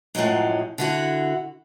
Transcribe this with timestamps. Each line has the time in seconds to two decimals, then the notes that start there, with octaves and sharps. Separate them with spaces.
0.15 F#2 A2 F3 F#3 G#3
0.78 D3 E4 F#4